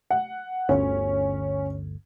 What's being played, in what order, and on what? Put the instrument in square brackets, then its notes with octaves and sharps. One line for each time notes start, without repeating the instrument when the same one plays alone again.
[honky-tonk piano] F#5
[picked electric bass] G1 D2 [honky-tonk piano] C#4